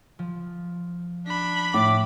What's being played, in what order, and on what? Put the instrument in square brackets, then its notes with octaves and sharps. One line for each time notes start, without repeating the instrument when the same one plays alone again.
[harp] F3
[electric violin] D4 B5
[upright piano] A2 [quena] D6